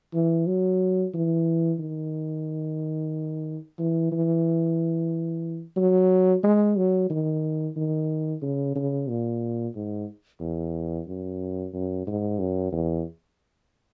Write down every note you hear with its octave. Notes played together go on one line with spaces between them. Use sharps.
E3
F#3
E3
D#3
E3
E3
F#3
G#3
F#3
D#3
D#3
C#3
C#3
A#2
G#2
E2
F#2
F#2
G#2
F#2
E2